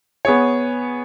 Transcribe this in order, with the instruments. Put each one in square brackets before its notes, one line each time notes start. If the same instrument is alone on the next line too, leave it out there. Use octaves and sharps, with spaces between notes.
[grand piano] B3 G#4 C#5